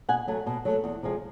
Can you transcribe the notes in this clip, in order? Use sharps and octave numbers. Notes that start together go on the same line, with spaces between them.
B2 F#5 G#5
F#3 A3
B2
F#3 A3
E2
C3 F3 G#3